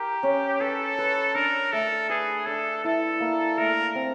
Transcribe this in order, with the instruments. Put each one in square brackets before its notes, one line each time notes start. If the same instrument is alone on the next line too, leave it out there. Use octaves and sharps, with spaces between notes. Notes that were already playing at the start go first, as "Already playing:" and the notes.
Already playing: [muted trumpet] G4 [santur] A#4
[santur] C#4
[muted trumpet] A4 [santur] B4
[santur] B4
[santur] D4 [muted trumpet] A#4
[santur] A3 [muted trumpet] A4
[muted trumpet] G#4 [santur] B4
[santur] D4 [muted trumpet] A4
[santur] E4 [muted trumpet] A4
[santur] A#3
[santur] A3 [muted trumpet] A#4
[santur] C4